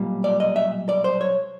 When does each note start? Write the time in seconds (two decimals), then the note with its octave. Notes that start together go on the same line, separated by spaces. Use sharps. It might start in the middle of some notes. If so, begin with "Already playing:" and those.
Already playing: B1 A#2 G3
0.24 D5
0.40 D#5
0.56 E5
0.89 D5
1.04 C5
1.21 C#5